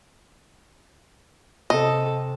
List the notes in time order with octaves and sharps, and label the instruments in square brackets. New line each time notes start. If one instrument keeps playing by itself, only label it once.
[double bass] C3 [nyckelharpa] A4 [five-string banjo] D#5